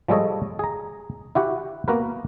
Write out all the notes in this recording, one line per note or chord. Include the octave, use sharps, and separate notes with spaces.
F3 G3 G#3 A4 C#5 D#5
G#4 A#5
E4 F#4 G4 F#5
A#3 B3 F#4 A#4 B4